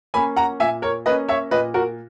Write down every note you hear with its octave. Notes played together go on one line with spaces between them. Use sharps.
A#3 C#4 G#5 B5
F#5 A#5
A#2 E5 G#5
A#4 C#5
A#3 C#4 B4 D#5
C#5 E5
A#2 B4 D#5
F#4 A#4